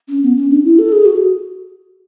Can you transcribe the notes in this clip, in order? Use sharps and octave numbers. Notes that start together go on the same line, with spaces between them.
C#4
B3
C#4
D4
E4
A4
G#4
F#4